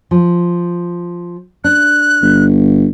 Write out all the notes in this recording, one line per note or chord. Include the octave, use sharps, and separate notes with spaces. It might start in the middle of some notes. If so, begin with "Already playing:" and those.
F3
D4 F#6
G1